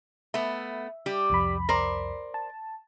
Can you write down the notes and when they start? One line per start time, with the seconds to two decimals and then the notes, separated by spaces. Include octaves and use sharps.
0.34 A3 B3 E5
1.06 G3 G4
1.30 C2 F2 B5
1.69 A#4 C5 D5
2.34 A5